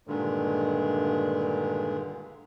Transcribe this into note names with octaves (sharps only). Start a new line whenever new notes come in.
G2 A#2 D3 D#3 G#3